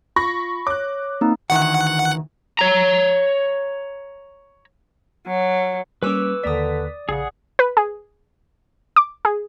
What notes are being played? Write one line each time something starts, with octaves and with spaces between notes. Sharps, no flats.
F4 B5 C#6 A#6
C#5 D6 F#6
A#3 C4 D#4
D2 D#3 E3 F#5
C#5 A#5
F#3
G3 A#3 C#4 B4 G#5 C#6 D6 E6
D#2 D3 A#3 D5 D#6 B6
A#1 C#3 G#4 F#5
B4
G#4
D6
G#4